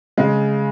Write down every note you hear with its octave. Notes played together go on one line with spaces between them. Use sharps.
C#3 G#3